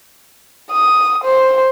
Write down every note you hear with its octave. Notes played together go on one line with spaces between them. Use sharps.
D#6
C5